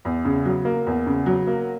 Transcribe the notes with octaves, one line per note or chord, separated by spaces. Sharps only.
E2
C#3
F#3
A#3
E2
C#3
F#3
A#3